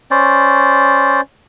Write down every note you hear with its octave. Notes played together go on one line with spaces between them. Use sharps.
C#4 C5 D5